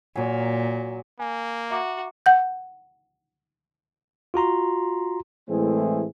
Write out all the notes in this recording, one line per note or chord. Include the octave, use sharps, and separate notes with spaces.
A#2 F#3 G#5
A#3 G#5
F#4 E5 A#5 D6
F#5 G6
F4 F#4 A#5 C6
A2 E3 G#3 A3 C4 G#4